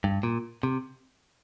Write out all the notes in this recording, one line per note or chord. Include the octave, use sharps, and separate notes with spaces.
G2
A#2
C3